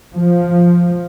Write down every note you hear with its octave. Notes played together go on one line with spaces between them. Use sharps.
F3